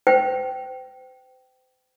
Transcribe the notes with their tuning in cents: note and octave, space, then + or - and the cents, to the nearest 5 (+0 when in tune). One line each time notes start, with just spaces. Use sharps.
C5 -40 G5 -15